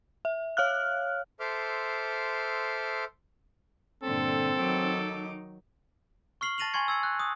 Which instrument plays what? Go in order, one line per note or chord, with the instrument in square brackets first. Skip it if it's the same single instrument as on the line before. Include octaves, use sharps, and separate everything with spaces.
[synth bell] E5
C#5 F5 F6 F#6
[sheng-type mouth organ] A4 C5 E5 C6 D6 F6
[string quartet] G2 A#2 D3 [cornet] C4 [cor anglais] A4
[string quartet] D#3 D#4 D6 [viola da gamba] F#3
[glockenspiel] C#6 F6 C7 F#7 G7
A5 A6 A#6 D#7 F7 F#7
G#5 C6 C#6 G#6 C#7
E6 G#6 C#7
F#6
D#6